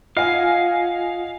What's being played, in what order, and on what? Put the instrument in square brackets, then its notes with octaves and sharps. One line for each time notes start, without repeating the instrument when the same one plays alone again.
[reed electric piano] F4 [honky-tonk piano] D#5 F#5 G#5 [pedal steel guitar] F5